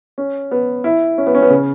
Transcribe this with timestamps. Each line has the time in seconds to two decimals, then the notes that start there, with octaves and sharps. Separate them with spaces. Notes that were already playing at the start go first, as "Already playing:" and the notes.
0.18 C#4
0.51 B3
0.84 E4
1.18 C#4
1.27 B3
1.35 C#4
1.42 B3
1.50 C#3